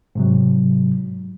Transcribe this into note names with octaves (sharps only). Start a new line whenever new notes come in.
G#2 C3 F#3